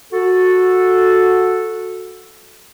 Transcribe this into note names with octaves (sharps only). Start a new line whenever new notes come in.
F#4 A4